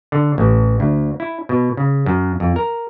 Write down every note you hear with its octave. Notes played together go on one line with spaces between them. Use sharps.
D3
A1
D2
E4
B2
C#3
F#2
F2
A#4